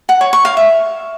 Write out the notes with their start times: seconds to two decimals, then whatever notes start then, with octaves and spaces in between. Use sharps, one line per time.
0.09 F#5
0.21 C#5
0.33 C#6
0.45 F5
0.57 E5